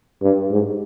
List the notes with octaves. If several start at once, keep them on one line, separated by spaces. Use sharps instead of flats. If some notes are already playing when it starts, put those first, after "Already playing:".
G2
G#2